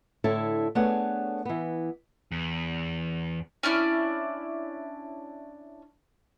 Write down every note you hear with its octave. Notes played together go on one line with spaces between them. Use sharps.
A2 D3 E4 A4 C#5 A5
A3 B3 D4 G#4 C#5 F#5
E3 B3
E2
C#4 D4 E4 D5